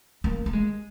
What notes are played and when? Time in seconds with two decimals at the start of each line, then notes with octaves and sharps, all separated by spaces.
0.24 A#3
0.46 A#3
0.53 G#3